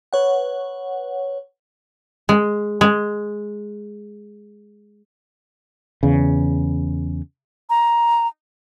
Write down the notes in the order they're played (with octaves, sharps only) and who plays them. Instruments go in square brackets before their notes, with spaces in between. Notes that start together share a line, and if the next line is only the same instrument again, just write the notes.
[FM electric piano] B4 C#5 F#5
[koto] G#3
G#3
[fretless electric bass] E2 C#3
[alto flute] A#5